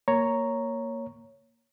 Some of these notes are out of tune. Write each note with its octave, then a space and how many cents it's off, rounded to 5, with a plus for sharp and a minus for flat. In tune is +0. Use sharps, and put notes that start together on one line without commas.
A#3 -5 C#5 +0 A#5 +0